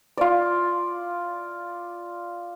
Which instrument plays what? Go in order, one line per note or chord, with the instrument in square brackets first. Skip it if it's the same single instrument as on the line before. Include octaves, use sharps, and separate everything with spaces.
[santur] F4 D5